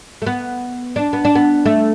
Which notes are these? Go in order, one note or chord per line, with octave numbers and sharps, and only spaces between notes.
A3
B3
D4
B3
D4
B3
A3